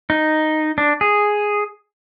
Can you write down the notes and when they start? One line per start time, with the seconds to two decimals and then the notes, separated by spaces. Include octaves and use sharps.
0.10 D#4
0.78 D4
1.01 G#4